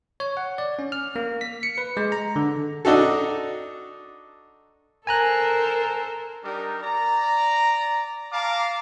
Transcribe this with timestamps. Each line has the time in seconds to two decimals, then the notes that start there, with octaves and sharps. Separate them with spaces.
0.20 C#5
0.37 F#5
0.58 D5
0.79 C#4
0.92 F6
1.16 A#3
1.41 B6
1.63 C#7
1.78 B4
1.97 G#3
2.12 A#5
2.36 D3
2.85 D4 D#4 F#4 A4
5.07 A4 A#4 C5 G#5 A#5 F#6
6.43 G3 D4 D#4 G4 A#4
6.82 D5 A#5
8.31 F5 A5 A#5 D6